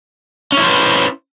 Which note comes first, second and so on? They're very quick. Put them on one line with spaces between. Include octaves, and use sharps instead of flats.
C#4 E4 C5 B4